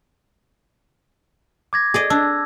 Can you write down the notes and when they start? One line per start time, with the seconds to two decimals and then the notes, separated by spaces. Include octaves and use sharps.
1.73 D6 G#6 A#6
1.94 G#4 D5 D#5
2.10 D4 E6